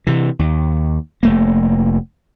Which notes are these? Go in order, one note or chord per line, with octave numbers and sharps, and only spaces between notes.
C3 E3
D#2
F1 A3 A#3